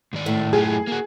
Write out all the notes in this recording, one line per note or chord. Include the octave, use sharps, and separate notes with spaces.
G#2 D#3 D5
A2
F#2 F4 G4 G#4
A#3 F#4